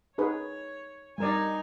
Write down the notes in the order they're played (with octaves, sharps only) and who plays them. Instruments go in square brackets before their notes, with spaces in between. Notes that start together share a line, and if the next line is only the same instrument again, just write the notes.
[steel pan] D#4 G#4 B4 [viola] C#5
[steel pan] G3 A#4 D5 [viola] D#4 G#5